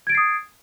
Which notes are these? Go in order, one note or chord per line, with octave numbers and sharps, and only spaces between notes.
D#6 G#6 A6 C7 D7